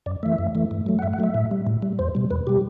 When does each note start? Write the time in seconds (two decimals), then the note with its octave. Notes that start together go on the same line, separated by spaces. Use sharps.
0.06 F#2 D5
0.23 E3 A3 E5
0.38 F#2
0.55 E3 A3
0.71 G2
0.86 F#3 A3
0.99 F#5
1.02 G2 E5
1.13 F#5
1.19 F#3 A3 E5
1.34 A2
1.51 G3
1.67 A2
1.82 G3
1.99 E2 C5
2.15 B2 G3
2.30 E2 B4
2.47 B2 G3 G4